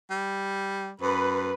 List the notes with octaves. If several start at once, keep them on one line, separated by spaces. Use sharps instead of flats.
G3
F#2 B4